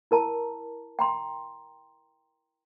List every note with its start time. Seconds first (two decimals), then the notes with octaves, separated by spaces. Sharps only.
0.11 E4 A#4 A5 A#5
0.99 G5 A#5 C6